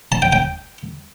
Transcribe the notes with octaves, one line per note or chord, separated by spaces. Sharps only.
A5
G5
G5